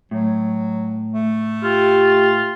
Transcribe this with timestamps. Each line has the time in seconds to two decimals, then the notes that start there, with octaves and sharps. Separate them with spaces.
0.11 A2 F#3
1.13 A3
1.64 F4 G4